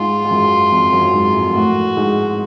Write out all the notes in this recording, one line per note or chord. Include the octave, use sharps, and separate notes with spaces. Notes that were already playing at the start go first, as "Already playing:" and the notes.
Already playing: G#2 G#3 F4
G#3
F#2 F#3
F2 F3
F#2 F#3
G#2 G#3
A2 A3
A2 A3 F#4
G#2 G#3